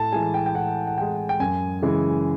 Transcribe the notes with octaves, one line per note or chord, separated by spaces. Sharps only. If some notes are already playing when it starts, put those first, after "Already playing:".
Already playing: A2 A5
E3 G#3 G#5
G5
G5
A2 F#5
F#5
E3 G#3 G5
G5
F#2 G#5
C#3 E3 G#3